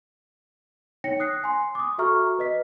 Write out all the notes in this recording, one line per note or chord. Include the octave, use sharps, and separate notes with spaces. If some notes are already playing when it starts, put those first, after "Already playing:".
D#4 C#5 G5 A#6 C#7
D#6 F#6 C7
G#5 C6
D6 D#6
F#4 A4 E5 A#5 C#6 F6
B4 D#5 B6